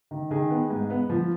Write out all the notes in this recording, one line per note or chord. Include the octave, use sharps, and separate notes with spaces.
D#3
D#3 G#4
B3
G#2
B3
F3